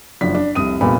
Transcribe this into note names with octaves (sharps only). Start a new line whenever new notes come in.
F#1 F3 D4 B6
D4
F1 C2 D#6 D#7
F1 A#2 G3 B3 B5